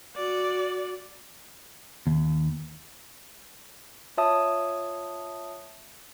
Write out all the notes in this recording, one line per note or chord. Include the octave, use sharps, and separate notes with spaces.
F#4 D5
D#2
F4 C#5 E5 A5 D#6